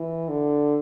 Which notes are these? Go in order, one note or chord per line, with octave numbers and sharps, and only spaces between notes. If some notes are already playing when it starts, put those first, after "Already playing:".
Already playing: E3
D3